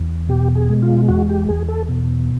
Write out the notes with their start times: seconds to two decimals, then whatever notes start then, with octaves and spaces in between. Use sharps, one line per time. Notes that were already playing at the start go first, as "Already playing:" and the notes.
Already playing: E2
0.29 B2 G4
0.55 G#4
0.69 G#3
0.82 F4
1.08 E2 F#4
1.29 G4
1.49 E2 G#4
1.68 A4
1.89 B2